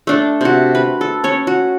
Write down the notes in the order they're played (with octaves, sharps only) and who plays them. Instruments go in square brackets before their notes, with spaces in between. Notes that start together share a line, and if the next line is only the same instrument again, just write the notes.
[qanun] A3 D4 A4
C3 F#4
B4
A4
C#4 C#5
F#4